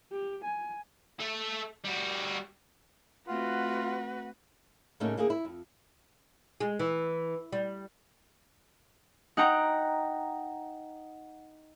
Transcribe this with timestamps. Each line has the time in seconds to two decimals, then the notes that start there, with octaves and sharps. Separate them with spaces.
0.12 G4
0.45 G#5
1.19 A3 A4
1.84 G3 F#4
3.28 A3 C4 F4 F#4 B4 F#5
5.00 A2 C#3 A3 A#3 C#4 D#4
5.17 D3 A#3 E4 G#4
5.30 E4
5.45 F2
6.60 G#3
6.79 E3
7.52 G3
9.37 D#4 F#5 G5 A#5